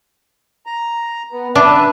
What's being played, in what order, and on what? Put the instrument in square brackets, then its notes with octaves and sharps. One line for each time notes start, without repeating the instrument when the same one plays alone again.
[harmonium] A#5
B3
[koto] D4 [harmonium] B4 E5